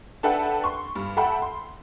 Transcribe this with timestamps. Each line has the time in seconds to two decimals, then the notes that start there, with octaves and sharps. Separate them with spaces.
0.23 D4 A4 B4 E5 F#5 G5
0.64 C6 C#6
0.95 G2
1.17 A4 E5 F#5 G5 B5
1.42 C6